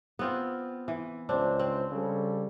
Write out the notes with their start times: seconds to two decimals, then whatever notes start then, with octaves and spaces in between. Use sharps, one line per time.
0.19 B3 C4 F4
0.88 E3
1.29 C#2 C4 D4 C5
1.59 C4
1.92 C#3 G3 A4